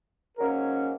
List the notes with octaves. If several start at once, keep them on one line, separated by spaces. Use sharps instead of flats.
G#2 F#3 A#3 C#4 A#4